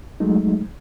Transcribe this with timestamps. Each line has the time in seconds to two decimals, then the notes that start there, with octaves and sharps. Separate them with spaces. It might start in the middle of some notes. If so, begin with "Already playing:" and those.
0.20 F#3 G#3 A3 D#4